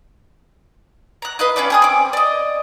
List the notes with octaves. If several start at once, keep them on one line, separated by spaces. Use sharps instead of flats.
A#5 F#6
B4 D#5 F5 F#6
C#4 F4 B4 D5
G4 G#4 D#6
C4 D6
D5 D#5